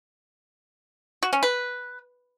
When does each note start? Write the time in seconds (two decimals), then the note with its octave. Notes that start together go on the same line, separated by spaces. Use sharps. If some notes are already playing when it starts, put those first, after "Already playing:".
1.23 F#4
1.33 C#4
1.43 B4